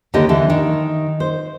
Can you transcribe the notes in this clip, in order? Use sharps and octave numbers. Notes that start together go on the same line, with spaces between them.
D#2 D3 G4 D#5
D3 E3
D#3
C5